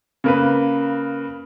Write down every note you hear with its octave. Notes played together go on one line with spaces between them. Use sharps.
C#3 A#3 B4